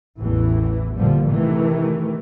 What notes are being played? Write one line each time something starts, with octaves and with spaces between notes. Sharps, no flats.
A1 E2 A2 E3
G2 A#2 D3 F3 G3
C3 D#3 E3 A3